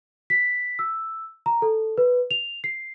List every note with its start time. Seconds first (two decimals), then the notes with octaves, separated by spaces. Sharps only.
0.30 B6
0.79 E6
1.46 A#5
1.62 A4
1.98 B4
2.31 F7
2.64 C7